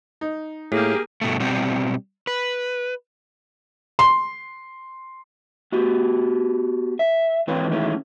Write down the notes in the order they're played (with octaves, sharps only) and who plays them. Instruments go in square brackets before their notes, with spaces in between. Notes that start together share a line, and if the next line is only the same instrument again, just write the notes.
[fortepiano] D#4
[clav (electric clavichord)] A2 [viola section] A#3 G4 [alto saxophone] G#4
[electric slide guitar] G2 B2 A3
B2 G3 C4
B4
[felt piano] C6
[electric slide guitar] B3 F#4 G4
E5
G#2 E3 C4 F4 B4 C#5
D#3 E3 G#3 A3 C#4 E4